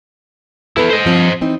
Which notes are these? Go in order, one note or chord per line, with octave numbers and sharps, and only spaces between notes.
B3 E4 A4 B4
C5 D#5
G2 F3 C4
E3 C4 D#4